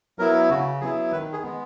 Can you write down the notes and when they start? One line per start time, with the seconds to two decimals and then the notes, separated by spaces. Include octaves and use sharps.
0.19 F#3 B3 E4 A#4
0.50 C#3 F#4
0.81 F#3 B3 E4 G#4
1.12 D#3 B4
1.33 G#4
1.43 G#3 B3